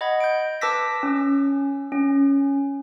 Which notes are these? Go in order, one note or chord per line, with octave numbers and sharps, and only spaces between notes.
D#5 F#5 B5 G#6
G6 D7
B4 A5 D6 E6 A#6 B6
C#4
C#4